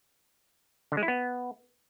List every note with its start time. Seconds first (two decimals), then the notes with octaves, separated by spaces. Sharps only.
0.92 D3
0.97 G#3
1.03 E4
1.08 B3